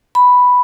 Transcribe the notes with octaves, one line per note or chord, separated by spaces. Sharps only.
B5